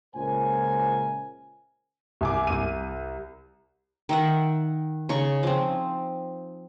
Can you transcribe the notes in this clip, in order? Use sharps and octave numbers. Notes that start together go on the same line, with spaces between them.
C#2 A#2 A#4 C5 G#5
C2 G#5 D6
C2 D#7
D#3 E5 F#5
C#3 D#4 C#6
F3 C4